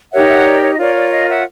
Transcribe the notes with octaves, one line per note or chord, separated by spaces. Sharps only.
D#4 G4 A#4 C#5 E5 F#5
E5 F#5
D#5
D5
C#5
D#5
F4 A#4 C#5 D5
D5
D#5 F5
E5 F#5